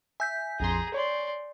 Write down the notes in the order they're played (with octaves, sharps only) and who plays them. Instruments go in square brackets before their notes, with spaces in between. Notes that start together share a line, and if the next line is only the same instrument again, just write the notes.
[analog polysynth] E5 [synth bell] G#5 G6 B6
[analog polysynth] A#1 F2 C6 [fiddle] G#4 A#5
[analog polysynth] C#5 [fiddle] D5 C6